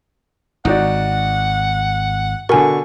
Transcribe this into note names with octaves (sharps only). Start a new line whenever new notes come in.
G#1 D#4 F#4 D5 F#5
B2 D3 A#4 G#5 C#6